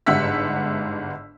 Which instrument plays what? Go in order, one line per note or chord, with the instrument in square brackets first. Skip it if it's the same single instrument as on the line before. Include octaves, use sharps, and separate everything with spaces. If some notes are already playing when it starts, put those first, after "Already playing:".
[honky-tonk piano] G1 G#2 E5 F#5 E6 B6